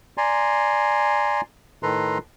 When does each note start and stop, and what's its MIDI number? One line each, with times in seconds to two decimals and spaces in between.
0.18 1.41 74
0.18 1.41 80
0.18 1.41 82
0.18 1.41 84
1.83 2.18 45
1.83 2.18 51
1.83 2.18 69
1.83 2.18 71
1.83 2.18 82
1.83 2.18 84